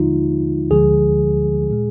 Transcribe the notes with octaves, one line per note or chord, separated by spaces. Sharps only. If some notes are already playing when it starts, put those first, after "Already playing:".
Already playing: D#2 D3 F3 G#3 D#4 F4
D2 D3 F3 G#3 G#4
A#2 G#3